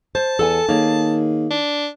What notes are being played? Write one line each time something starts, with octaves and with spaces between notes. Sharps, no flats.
C5 A5
E2 A4 F#5 G#5
D#3 A#3 G#4 C#5
D4